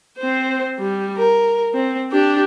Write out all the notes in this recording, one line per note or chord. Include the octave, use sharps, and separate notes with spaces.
C4 C5
G3
A#4
C4
D4 G4